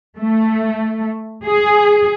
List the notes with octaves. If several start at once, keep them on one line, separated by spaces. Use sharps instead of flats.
A3
G#4